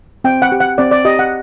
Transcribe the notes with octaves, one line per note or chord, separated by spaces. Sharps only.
C4 G5
F#5
G4
F#5
C4 D5
D5
G4 D#5
F#5